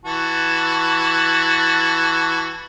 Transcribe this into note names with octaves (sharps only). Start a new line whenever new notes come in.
E3 F#4 A5